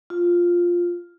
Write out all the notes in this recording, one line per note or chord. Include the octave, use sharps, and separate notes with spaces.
F4